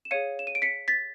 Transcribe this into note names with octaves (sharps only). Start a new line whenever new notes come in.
E7
G#4 C#5 F5 C#7 D#7
E7
D#7
D7
B6 C#7
A6 B6